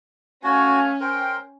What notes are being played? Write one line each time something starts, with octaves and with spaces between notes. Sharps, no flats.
A3 C#4 F#4 F5 G#5
A#4 C5 G5